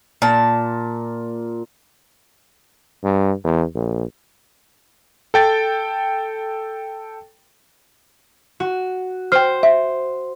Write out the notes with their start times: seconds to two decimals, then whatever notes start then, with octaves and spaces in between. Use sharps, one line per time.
0.22 A#2 A5
3.04 G2
3.44 E2
3.75 A#1
5.34 A4 G5 A6
8.60 F#4
9.32 C5 G5 F6
9.63 E5